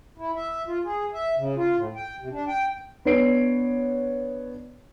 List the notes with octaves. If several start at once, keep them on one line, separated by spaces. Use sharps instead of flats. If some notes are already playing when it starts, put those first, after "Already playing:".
E4
E5
F4
G#4
E5
C#3
F4
A2
G5
C3
D4
G5
B3 D4 C#5 C7 D7